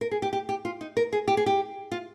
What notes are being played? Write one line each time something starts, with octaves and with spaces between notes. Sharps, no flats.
A#4
G#4
G4
G4
G4
F4
D#4
A#4
G#4
G4
G#4
G4
F4